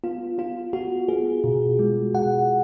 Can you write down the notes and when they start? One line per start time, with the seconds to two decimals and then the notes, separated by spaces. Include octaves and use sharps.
0.04 B3 F4
0.38 B3 F4
0.73 B3 F#4
1.08 B3 G#4
1.44 B2
1.79 G#3
2.14 B2 F#5